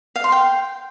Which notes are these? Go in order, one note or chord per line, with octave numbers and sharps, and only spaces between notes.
F5
C6
G5